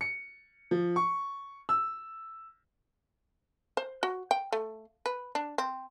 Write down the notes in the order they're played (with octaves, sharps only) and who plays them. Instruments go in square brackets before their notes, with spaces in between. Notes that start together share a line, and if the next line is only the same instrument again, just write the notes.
[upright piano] C#7
F3
C#6
E6
[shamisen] C5
F#4
G5
A3
B4
D4
C4